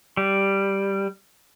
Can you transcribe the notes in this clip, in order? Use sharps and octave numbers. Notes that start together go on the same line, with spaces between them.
G3